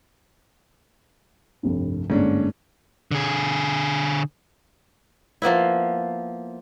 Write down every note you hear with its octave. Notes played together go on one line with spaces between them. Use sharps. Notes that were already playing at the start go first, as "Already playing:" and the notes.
F1 C2 G2
G1 G#2 A#3 C#4 D4
D3 G#4
F3 A#3 B3 E4